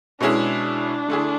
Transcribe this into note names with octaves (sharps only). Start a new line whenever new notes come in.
B2 G#3 C#4 D4 E4 G#4
D3 A3 E4 G#4